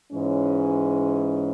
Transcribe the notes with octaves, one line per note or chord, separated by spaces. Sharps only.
G#2 E3 G#3 C#4